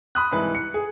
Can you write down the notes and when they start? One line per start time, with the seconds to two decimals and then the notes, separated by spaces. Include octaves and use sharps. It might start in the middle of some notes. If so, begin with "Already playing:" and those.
0.15 B5 D#6 F#6
0.31 C2 G#2 E3 B4
0.55 C#7
0.74 G#4